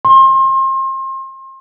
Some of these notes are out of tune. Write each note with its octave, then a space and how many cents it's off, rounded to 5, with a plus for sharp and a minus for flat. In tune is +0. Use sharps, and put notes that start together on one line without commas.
C6 +35